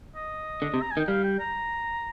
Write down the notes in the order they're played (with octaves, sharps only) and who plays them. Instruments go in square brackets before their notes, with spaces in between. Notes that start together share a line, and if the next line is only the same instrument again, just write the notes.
[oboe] D#5
[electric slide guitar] D3
C3
[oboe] A#5
G#5
[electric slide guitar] D#3
[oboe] G5
[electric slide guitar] G3 [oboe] F5
[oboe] G5
A#5